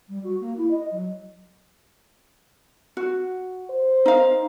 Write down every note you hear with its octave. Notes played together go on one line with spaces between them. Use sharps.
G3
F#4
A#3
E4
D#5
F#3
F#4
C5
D#4 F5